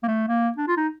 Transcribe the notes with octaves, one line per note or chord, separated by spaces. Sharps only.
A#3
A3
A#3
D4
F4
D#4